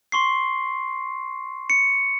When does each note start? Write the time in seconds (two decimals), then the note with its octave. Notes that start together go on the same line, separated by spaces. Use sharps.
0.12 C6 C#6 C7
1.70 C#7